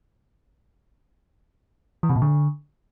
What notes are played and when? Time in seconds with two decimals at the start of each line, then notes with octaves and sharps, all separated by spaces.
2.03 E3
2.09 C3
2.16 A#2
2.22 D3